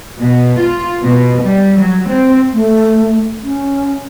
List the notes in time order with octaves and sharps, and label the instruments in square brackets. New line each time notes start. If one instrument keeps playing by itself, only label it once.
[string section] B2
F4
B2
G3
F#3
C4
[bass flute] A3
C#4